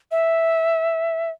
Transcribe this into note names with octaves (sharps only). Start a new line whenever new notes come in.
E5